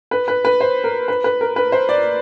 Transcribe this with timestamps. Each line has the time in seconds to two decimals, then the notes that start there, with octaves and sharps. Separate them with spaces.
0.11 B4
0.28 B4
0.45 B4
0.60 C5
0.84 A#4
1.08 B4
1.24 B4
1.41 A#4
1.56 B4
1.72 C5
1.89 D5